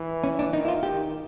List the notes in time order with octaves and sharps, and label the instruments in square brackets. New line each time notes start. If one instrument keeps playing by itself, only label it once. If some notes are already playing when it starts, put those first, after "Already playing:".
Already playing: [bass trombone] E3
[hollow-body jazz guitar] C#4
D4
[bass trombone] D#3 [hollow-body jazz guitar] D#4
[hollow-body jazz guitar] E4
F4
[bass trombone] D#3 [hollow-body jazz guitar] G4